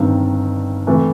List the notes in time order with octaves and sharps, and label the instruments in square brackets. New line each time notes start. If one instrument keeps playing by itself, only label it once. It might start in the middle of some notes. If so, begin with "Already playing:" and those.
Already playing: [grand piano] G1 G2 D#3 G3 C4
C3 E3 A3